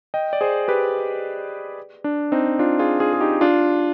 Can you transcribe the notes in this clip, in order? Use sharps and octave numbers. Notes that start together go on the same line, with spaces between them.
D#5 G5
D5
G#4 C5
G4 B4
D4
C4 D#4
D4 F4
F4 G#4
F4 G#4
G#4
D#4 G4
D4 F4